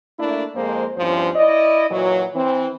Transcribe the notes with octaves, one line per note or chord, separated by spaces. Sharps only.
A3 A#3 D4 E4
F2 G#3 A#3 C5
E2 G2 F3 C#4 C5
E4 D5 D#5
A#2 E3 F#3
E3 C4